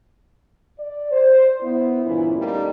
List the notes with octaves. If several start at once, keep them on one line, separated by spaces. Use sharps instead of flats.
D5
C5
B3 E4
D2 G2 A#2 E3 C#4 E4
G3 A3 A#3 D#4 G4